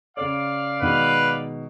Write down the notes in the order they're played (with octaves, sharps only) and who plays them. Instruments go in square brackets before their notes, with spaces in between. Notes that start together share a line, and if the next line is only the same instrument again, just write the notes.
[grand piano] C#3 C#5 [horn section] D5 F5
[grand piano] B2 D#3 G#3 [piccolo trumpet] B4